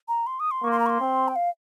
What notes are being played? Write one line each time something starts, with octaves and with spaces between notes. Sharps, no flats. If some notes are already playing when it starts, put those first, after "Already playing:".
A#5
C6
D#6
C6
A#3 C#6
C6
A#5
C#6
C6
C4
G5
F5